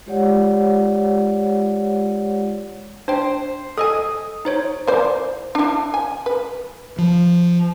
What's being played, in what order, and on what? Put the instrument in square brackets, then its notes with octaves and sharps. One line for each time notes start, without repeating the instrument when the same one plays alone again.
[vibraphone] G#3 F4 G4 C#5 D5 F#5
[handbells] D4 G5 [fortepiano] C5
[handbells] A4 D#5 G#5 [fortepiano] D#6
[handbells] D#4 C5 C#5
[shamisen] E3 C5 D5
D4 E4
G#5
B4
[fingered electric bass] F3